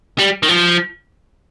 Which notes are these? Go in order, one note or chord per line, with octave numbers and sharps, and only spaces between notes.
G3
D#3
F3